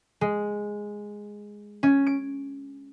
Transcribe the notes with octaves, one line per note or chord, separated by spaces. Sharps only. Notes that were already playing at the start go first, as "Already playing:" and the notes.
G#3
C#4
D7